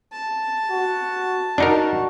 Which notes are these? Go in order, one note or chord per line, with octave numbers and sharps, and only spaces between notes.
A5
F#4
D4 D#4 F#4 A#4